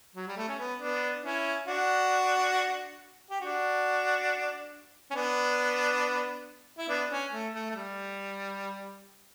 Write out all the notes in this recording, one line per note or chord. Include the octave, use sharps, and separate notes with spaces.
F#3
G3
A3
C#4
B3
B3 D4
C#4 E4
D4 F#4
G4
D4 F#4
C#4
B3 D4
E4
B3 D4
C#4
A3
A3
A3
G3